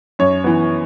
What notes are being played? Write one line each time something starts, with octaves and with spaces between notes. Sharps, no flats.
F#2 C#5
E3 B3